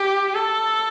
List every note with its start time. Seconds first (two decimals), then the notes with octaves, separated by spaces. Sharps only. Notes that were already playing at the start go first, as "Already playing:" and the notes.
Already playing: G4
0.34 A4